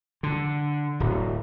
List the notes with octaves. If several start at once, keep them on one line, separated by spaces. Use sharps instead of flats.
D3
D1